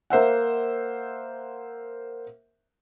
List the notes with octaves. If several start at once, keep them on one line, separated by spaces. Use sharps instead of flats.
A#3 C5 E5 F#5